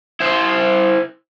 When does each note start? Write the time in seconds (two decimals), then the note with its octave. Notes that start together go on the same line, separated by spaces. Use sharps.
0.20 E4 C5